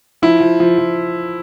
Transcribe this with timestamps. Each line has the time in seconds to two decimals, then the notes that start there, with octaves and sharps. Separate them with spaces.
0.22 F3 E4
0.40 F3
0.60 F3
0.78 F3